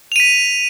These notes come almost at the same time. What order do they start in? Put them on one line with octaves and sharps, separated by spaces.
F7 D#7 B6